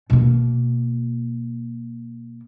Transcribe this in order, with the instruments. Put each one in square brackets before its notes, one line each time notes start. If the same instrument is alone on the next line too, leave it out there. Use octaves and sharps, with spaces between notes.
[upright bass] B2 A#3